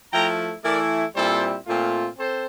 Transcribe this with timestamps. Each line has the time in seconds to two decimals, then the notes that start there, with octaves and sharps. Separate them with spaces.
0.12 F3 A3 E4 G5 A#5
0.64 E3 A3 E4 A#4 D5
1.15 A#2 G3 C4 E4 A4 C5
1.67 A#2 A3 C4 F4
2.18 C4 A4 C5